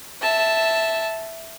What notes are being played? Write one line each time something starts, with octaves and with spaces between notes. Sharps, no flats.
E5 A5